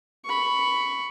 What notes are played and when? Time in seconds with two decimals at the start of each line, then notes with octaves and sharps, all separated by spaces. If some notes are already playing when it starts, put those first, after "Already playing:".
0.25 B5 C#6